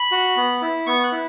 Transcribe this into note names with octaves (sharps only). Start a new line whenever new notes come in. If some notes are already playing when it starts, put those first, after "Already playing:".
Already playing: B5
F#4
B3
E4
B3 C#6
F#6
E4